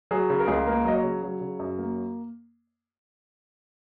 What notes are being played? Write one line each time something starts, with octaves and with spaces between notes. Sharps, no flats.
F#3 G#4
C#3
A#4
C#2 G#4
A#4
A#3 A#4
F#3 D#5
C#5
C#3
F#3
C#3
F#2
A#3